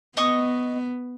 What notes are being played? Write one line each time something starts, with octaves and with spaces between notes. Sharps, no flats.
B3 D#5 C#6 D#6